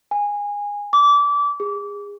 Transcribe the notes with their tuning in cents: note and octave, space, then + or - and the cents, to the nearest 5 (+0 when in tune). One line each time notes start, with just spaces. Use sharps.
G#5 -20
D6 -25
G#4 -30